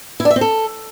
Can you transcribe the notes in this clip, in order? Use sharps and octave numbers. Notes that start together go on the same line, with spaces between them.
E4
D4
E5
C4
A4